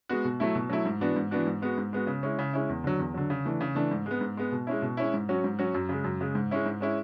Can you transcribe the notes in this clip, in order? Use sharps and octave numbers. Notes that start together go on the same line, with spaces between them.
G#3 B3 F#4
B2
F#3 A3 E4
B2
F#3 A3 E4
G#2
E3 B3 D4 F#4
G#2
E3 B3 D4 F#4
G#2
G#3 B3 F#4
G#2
G#3 B3 F#4
C#3
G#3 C#4 E4
C#3
G#3 C#4 E4
E2
D3 F#3
E2
D3 F#3
C#3
E3 A3 D4
C#3
E3 A3 D4
G#2
G#3 B3
G#2
G#3 B3
B2
G#3 C#4 E4
B2
G#3 C#4 E4
G#2
F#3 C#4 F#4
G#2
F#3 C#4 F#4
F#2
C#3 G#3
F#2
C#3 G#3
G#2
G#3 C#4 E4
G#2
G#3 C#4 E4